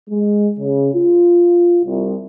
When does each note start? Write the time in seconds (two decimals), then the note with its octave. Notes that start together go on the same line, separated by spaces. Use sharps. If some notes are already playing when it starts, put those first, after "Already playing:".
0.10 G#3
0.59 C#3
0.95 F4
1.85 C2